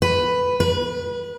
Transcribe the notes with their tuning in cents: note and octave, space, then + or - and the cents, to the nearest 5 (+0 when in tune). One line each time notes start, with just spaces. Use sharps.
B4 +5
B4 -30